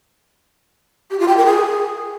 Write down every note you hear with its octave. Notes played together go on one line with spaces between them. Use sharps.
G4
F4
G5
A#4
G#4